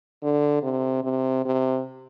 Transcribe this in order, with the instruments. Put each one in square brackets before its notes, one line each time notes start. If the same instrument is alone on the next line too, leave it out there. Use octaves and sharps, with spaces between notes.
[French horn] D3
C3
C3
C3